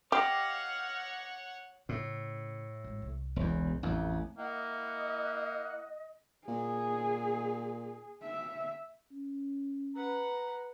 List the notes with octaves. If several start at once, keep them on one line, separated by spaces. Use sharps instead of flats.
G4 C#5 D#5 F5 F#5 D6 F6
A2 C#3
G#1
C2
E1 E2
A1 F2 F#3
A#3 E4 D#5 F#5
A#2 G#4
E5
C#4
B4 F#5 A#5